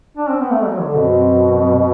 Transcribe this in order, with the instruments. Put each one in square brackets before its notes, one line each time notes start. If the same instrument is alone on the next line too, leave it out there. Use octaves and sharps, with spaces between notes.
[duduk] D4
C4
B3
A3
F#3
D3
[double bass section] F#2 F#3 C4 [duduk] B2